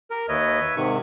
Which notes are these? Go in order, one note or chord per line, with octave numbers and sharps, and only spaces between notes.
G4 A#4
D#2 B4 C#5 D#5 E5
G#2 C3 D#3 C#6